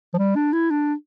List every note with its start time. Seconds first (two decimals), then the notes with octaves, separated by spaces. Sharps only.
0.14 F3
0.18 G3
0.36 D4
0.53 E4
0.70 D4